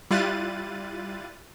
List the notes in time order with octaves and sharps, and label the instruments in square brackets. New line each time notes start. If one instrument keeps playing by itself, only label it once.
[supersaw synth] G3 E4 F4 F#6 A6 D#7